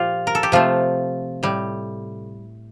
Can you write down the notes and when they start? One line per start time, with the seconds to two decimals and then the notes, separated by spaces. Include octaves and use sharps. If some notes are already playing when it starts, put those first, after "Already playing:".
Already playing: A#2 F3 F4 G4
0.27 A#4
0.35 A4
0.43 G4
0.52 C3 F3 A3 F4
1.43 A2 G3